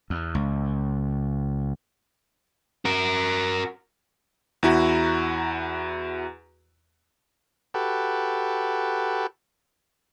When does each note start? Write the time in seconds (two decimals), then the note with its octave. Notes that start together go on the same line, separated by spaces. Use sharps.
0.10 E2
0.35 C#2
2.85 F#4 A#4
4.63 E2 E4 F#4 A#5
7.74 F#4 G4 A4 B4